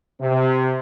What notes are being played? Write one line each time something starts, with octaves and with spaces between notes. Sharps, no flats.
C3